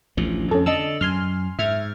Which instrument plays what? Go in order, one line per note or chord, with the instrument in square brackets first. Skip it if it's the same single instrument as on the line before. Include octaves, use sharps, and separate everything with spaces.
[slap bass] A1 D2 F3
[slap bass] F2 [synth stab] C#4 A4
[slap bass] D3 [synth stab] D#5 A5 E6
[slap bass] F#2 [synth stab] G#5 C6 F6
[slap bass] G#2 [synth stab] E5 F6 G#6